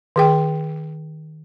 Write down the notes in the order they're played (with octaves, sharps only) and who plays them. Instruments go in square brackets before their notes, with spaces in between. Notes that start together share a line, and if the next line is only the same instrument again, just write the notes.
[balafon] D#3 G#4 G5